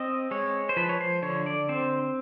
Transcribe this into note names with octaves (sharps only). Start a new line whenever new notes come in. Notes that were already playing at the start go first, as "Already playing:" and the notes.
Already playing: C4 D#5
G#3 C#5
C5
F3 B4
C#5
C5
D3 C#5
D5
C4 C5